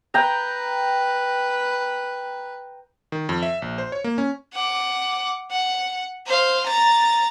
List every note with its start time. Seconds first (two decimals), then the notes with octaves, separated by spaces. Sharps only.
0.14 B4 G5 A#5
3.12 D#3
3.29 F2
3.43 E5
3.62 A#1
3.78 C5
3.92 C#5
4.04 A#3
4.18 C#4
4.54 F#5 D6
5.51 F#5
6.26 C5 F5
6.66 A#5 A6